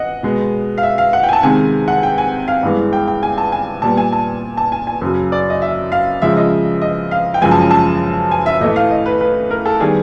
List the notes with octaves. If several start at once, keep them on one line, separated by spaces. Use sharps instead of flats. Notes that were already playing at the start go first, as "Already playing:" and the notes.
Already playing: D#5 F#5
B2 G#3 B3
F5
E5
F5
F#5
G5
G#5
A5
C3 D#3 G#3 G#5
F#5
G5
G#5
F5
G2 E3 G#3 B3
G5
G5
G#5
A5
G#5
A#2 G3 B3 A5
G#5
A5
A5
G#5
G#5
F#2 C#3 F#3
D5
D#5
E5
F5
C#3 F3 G#3 E5
D#5
D#5
F5
G5
F#2 C#3 F3 G#3 G#5
A5
G#5
A5
G#5
E5
A2 E3 A3 D#5
F5
D#5
B4
B4
A#4
A4
D#3 G3 B3 G#4